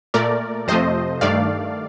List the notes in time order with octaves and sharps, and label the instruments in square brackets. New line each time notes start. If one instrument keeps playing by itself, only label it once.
[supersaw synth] A#2 A3 A#4 D5
F2 C3 F3 A3 C5 D#5
G2 D#3 A3 D5 F5